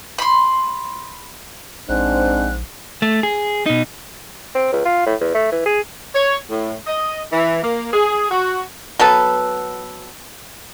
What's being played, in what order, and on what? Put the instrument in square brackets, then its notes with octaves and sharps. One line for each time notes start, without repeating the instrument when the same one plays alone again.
[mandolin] B5 C6
[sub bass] A#1 [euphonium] G#2 [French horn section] C4 D4 C5 [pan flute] F#6
[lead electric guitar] A3
G#4
B2 D#4
[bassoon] C4
C#2
F4
A2
E2
A3
E3
G#4
[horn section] C#5
A2
D#5
E3
A#3
G#4
F#4
[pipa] F#3 B3 A4 B4